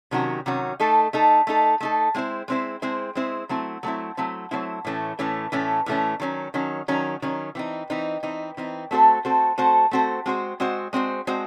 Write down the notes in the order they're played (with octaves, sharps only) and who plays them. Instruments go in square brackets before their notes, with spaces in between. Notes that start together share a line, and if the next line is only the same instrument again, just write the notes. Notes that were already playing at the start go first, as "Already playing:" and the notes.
[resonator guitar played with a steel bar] C3 D#3 F#3 C#4 F#4
C3 D#3 F#3 C#4 F#4
A3 D#4 A4
A3 D#4 A4
A3 D#4 A4
A3 D#4 A4
G#3 C4 E4 C5
G#3 C4 E4 C5
G#3 C4 E4 C5
G#3 C4 E4 C5
F#3 A3 C4 E4
F#3 A3 C4 E4
F#3 A3 C4 E4
F#3 A3 C4 E4
A2 E3 A3 C#4
A2 E3 A3 C#4
A2 E3 A3 C#4
A2 E3 A3 C#4
D#3 F#3 C#4
D#3 F#3 C#4
D#3 F#3 C#4
D#3 F#3 C#4
E3 C4 D#4
E3 C4 D#4
E3 C4 D#4
E3 C4 D#4
A3 C4 F#4 A4 C5
A3 C4 F#4 A4 C5
A3 C4 F#4 A4 C5
A3 C4 F#4 A4 C5
G#3 C4 F#4 C5
G#3 C4 F#4 C5
G#3 C4 F#4 C5
G#3 C4 F#4 C5